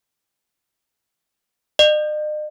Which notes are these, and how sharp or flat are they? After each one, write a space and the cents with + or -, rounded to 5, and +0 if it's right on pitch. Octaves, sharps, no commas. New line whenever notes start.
D#5 -45